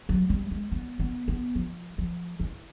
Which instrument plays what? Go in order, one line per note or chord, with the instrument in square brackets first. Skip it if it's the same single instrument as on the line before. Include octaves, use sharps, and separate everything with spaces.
[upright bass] F#3
G3
G#3
B3
B3
B3
F3
F3
E3